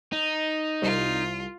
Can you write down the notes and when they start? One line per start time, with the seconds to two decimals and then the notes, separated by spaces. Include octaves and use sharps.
0.12 D#4
0.82 C2 F4